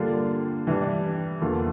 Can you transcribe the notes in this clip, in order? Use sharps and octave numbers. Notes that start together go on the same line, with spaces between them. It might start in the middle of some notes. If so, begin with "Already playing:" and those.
Already playing: D3 G3 A#3 D4 F4
E3 G3 D4
E2 D3 F3 A#3 F4